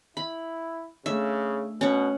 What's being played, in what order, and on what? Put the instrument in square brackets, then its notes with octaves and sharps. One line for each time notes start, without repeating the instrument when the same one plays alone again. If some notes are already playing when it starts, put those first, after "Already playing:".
[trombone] E4 [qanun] B5
[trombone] C#3 [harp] A3 D4 [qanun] E5
[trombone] B2 [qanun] C#4 F#5